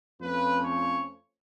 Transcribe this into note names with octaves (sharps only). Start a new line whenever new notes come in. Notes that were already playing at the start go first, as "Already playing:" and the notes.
F2 F3 A3 C#4 F4 B4
C#5